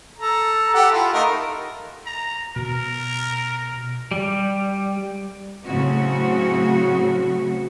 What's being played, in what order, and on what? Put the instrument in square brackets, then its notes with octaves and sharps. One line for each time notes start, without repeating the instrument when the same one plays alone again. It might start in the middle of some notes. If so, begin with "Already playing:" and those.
[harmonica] A4 A#5
G4 A4 F#5
E4 F4
A3 D#4 A#4
[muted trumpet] A#5
[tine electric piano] B2 [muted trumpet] A#4
[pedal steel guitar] G3
[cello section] A2 C#3 F#3 C4 F#4